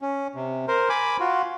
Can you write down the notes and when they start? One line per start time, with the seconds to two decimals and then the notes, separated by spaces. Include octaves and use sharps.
0.02 C#4
0.35 C3
0.68 A#4 C5
0.89 G#5 B5 D6
1.20 F4 F#4